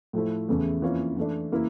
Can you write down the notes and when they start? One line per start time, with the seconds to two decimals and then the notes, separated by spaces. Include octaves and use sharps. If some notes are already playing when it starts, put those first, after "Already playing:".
0.13 A2 F3 A3 E4
0.49 E2 C#3 E3 A3
0.82 F2 E3 A#3 C#4 F4
1.17 E3 A3 D4
1.52 C#3 E3 A#3 E4